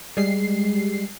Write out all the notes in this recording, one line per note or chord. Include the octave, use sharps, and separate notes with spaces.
G3 G#3 C7